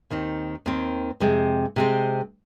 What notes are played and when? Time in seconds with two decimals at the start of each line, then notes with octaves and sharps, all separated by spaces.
0.10 D#2 D#3 C4 D#4
0.66 D#2 D#3 C4
1.20 F2 C3 G#3 C4
1.76 C3 G#3 C4